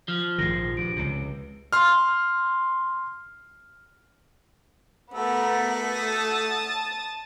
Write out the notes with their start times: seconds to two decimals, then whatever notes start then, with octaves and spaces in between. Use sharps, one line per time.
0.08 F3 F6
0.38 A#1 G#2 D#3 A#6 C7
0.77 G2 D7
0.96 C#2 C3
1.73 C6 F6
5.14 A3 B3 F#4 A4 A#4
5.93 A5 D#6 A6